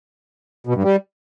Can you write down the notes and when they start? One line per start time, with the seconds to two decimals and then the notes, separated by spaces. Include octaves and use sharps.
0.67 B2
0.75 G2
0.83 G3